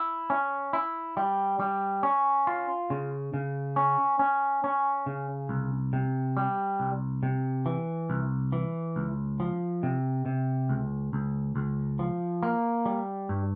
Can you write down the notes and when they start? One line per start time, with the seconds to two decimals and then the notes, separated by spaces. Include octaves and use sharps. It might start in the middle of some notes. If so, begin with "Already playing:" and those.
Already playing: E4
0.30 C#4
0.73 E4
1.17 G3
1.60 G3
2.03 C#4
2.47 F4
2.90 C#3
3.34 C#3
3.76 C#4
4.19 C#4
4.64 C#4
5.06 C#3
5.49 C2
5.93 C3
6.37 G3
6.80 C2
7.23 C3
7.66 E3
8.10 C2
8.52 E3
8.96 C#2
9.40 F3
9.83 C3
10.26 C3
10.69 C#2
11.13 C#2
11.56 C#2
11.99 F3
12.43 A#3
12.86 G3
13.29 G2